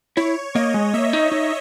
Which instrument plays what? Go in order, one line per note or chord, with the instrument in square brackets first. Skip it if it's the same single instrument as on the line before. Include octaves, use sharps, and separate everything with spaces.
[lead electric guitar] E4 [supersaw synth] C#5
[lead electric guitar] A#3 [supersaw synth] D#5
[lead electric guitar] G#3
[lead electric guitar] A#3 [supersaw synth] E5
[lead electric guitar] D#4
D#4